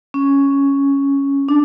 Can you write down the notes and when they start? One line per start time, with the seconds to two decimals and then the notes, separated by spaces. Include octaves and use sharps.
0.14 C#4
1.49 D4